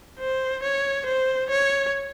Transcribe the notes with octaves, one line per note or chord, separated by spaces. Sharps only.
C5
C#5
C5
C#5